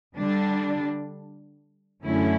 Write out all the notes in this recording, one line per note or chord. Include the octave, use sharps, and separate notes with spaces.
D3 G3 D4
F#2 D3 A3 C#4 E4